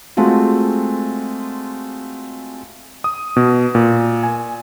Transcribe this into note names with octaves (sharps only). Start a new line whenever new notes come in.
G#3 A3 C4 F4 F#4
D#6
B2
A#2
G#5